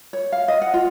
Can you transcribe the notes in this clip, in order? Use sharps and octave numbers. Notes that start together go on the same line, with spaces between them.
C#5
F5
D#5
F#5
F4